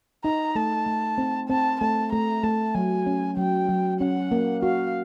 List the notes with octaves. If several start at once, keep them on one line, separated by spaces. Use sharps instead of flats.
D#4 A#5
A3 A5
A3
C4
C4 A5
A3 A5
A3 A#5
A3 A5
F#3 G#5
C#4
F#3 G5
F#3
C#4 F#5
A#3
F#4 F5